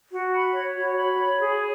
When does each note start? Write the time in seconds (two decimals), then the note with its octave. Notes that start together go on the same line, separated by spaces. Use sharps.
0.11 F#4
0.33 B5
0.54 C#5
0.75 F#4
0.97 B5
1.18 C#5
1.40 G#4